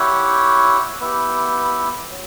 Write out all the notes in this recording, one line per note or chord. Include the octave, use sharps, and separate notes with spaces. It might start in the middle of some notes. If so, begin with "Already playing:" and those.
Already playing: E4 G4 C#5 F#5
B3 E4 G4
F#3